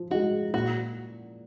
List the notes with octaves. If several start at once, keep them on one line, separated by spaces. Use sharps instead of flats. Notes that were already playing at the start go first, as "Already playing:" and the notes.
Already playing: F3
G#3 D#4 F#4
A#2 F#4